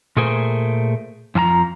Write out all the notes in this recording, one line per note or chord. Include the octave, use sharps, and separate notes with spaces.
A#2 A3 G#4 A#4 C5
F2 F3 A5 A#5